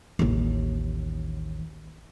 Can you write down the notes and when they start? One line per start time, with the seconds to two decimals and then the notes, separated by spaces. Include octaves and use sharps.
0.19 A1 D#2